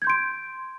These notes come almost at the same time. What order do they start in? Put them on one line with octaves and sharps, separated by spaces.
G#6 G6 C6 D7